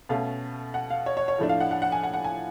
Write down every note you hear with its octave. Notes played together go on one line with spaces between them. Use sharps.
B2 A3 C#4 F5
F#5
F5
C#5
C#5
C#5
A2 F3 A3 D4
F5
F#5
F#5
F#5
G#5
F#5
F#5
G#5